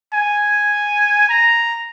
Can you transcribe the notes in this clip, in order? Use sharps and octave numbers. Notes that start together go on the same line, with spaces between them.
G#5
A#5